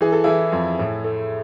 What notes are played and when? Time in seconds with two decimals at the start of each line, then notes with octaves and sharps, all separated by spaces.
0.01 E3 G#4
0.12 A4
0.24 E3 E4 G#4
0.52 F2
0.79 A2
1.04 A3